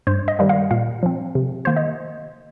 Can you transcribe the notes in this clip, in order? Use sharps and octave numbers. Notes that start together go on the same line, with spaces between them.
G2 C5
D#5
D#3 G3 A#3
F5
A#2 F5
F3 C4
C3
D#3 A#3 C5
D#5